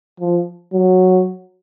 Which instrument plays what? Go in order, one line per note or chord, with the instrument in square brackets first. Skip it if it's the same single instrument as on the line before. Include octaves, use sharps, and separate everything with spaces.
[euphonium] F3
F#3